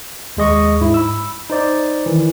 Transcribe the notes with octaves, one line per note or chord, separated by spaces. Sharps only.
D#2 G#3 D#5 C#6
G#2 E4
B5 E6
D#4 C5 D5
D#3 E3